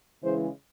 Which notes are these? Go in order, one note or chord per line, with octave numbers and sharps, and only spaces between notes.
C#3 E3 G#3 C5